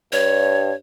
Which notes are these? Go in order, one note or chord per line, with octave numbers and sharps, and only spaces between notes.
G2 C#5